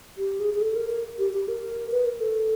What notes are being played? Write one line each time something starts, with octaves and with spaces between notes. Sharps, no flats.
G4
G#4
G#4
A4
A#4
A#4
G4
G4
A#4
B4
A#4
A4